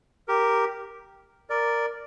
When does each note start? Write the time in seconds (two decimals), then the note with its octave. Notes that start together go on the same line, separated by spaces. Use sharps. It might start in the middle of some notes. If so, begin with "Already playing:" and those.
0.28 G4 A#4
1.50 A#4 D5